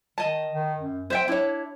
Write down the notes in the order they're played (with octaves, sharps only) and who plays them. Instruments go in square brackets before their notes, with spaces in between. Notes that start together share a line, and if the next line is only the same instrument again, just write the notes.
[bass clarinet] D#3 [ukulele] D#5 A5
[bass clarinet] D#3
F#2
[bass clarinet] C4 [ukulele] C5 E5 G5
[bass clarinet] D4 [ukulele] E4 C#5